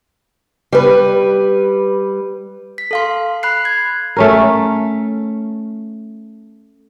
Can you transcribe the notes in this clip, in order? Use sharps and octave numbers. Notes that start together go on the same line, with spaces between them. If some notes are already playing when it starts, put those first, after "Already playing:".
G3 B4
B6
A4 F5 C6
B5 F#6 C7
G#6
A3 C#4 A#4